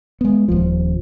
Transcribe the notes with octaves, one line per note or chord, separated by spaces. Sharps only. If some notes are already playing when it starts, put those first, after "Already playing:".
G#3 B3
D#1 D#2 F3